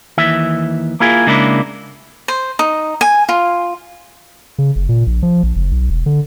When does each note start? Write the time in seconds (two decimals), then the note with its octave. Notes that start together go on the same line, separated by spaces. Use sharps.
0.18 D#2 E3 E5
1.00 A#3 E4 F4 G#4
1.27 C#3 G#3 A#3 D4 E4
2.28 C5
2.59 D#4
3.01 G#5
3.29 F4
4.58 C#3
4.76 F#1
4.89 A#2
5.07 A#1
5.23 F3
5.43 A#1
5.56 F#1
5.71 B1
5.90 E1
6.06 D3